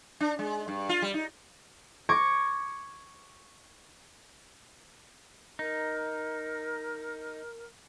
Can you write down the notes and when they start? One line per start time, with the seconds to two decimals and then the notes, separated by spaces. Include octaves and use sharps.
0.20 D4
0.39 G#3
0.68 G2
0.89 F4
1.02 G3
1.14 D#4
2.09 C#6 D6 G#6 A#6
5.59 D#4 A#4